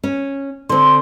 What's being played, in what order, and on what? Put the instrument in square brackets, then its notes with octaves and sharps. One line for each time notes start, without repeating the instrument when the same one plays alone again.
[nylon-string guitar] C#4
[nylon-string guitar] D3 C4 [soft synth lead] C6